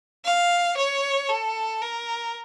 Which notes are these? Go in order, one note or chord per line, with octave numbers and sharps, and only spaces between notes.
F5
C#5
A4
A#4